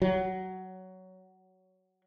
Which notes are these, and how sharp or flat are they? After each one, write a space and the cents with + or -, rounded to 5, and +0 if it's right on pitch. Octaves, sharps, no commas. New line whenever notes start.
F#3 +15